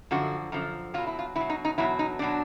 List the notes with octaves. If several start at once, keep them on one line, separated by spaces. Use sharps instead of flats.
F#2 D3 F3 F#4
F#2 D3 F3
B2 F#3 F4
E4
F4
B2 F#3 E4
D#4
D#4
E2 B2 F#3 E4
D#4
B2 F#3 D4